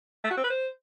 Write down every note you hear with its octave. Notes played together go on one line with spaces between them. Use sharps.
A3
F#4
C4
B4
C5